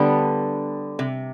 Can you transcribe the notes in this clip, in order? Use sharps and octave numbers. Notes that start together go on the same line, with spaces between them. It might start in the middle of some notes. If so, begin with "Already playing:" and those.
Already playing: D3 G3 B3 D4
C3